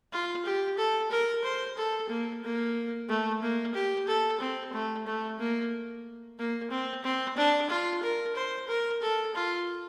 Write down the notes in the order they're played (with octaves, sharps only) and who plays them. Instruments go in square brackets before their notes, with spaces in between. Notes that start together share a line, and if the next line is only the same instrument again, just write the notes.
[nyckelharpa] F4
G4
A4
A#4
C5
A4
A#3
A#3
A3
A#3
G4
A4
C4
A3
A3
A#3
A#3
C4
C4
D4
F4
A#4
C5
A#4
A4
F4